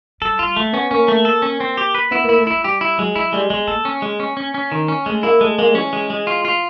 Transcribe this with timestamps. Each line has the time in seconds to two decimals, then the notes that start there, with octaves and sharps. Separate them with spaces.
0.21 G3 A4
0.39 G3 F4
0.56 A3 A#3
0.73 B3 C#4
0.91 A#3 C#4
1.08 A3
1.25 A4
1.42 C#4
1.60 C4
1.77 G4
1.95 B4
2.11 B3 E4
2.24 A#3 E4
2.38 A3
2.47 G#3 E4
2.64 G3 G4
2.81 E4
2.98 F#3 G#3
3.15 F#3 E4
3.33 G3 G#3
3.50 G#3 B3
3.67 A#3 A4
3.85 C#4
4.02 G#3
4.20 C#4
4.37 C#4
4.54 C#4
4.72 D#3
4.88 C#4
5.06 G#3 A3
5.23 A#3 E4
5.40 G#3 A3
5.59 G#3 A#3
5.75 E3 C#4
5.93 G#3
6.10 G#3
6.27 F4
6.45 F4